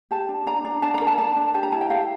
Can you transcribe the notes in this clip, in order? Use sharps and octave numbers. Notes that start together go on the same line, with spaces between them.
G4 A5
D4
D4 A#5
D4
D4 A5
A#5
A#4
A5
D4 A5
D4
G4 A5
A#5
E4 A5
G5
G4 F5